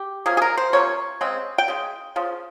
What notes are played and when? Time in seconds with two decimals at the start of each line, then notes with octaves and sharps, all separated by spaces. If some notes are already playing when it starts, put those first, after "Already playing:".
Already playing: G4
0.26 C3 F3 A#3 C#4 G#4
0.37 G#4
0.42 A#4
0.58 C5
0.73 C3 F3 A#3 C#4 C#5
1.21 C#3 G#3 C4
1.58 G5
1.68 C#3 G#3
2.16 C#3 F3